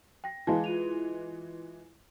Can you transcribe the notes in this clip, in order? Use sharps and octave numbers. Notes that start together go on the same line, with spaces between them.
G5 A#6
E3 G#3 F5 G#5 A5
F4 D#7 F7